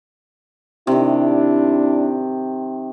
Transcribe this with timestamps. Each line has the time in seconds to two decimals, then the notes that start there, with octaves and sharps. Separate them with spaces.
0.87 C3 D#3 D4 E4